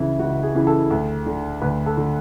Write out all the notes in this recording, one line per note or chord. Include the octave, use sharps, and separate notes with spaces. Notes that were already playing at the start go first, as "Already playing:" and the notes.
Already playing: C#2 C#3 E3 D4 E4
C#2 F#4
G#4
C#3 E3
A4
D2
D3
D2 B4
A4
D3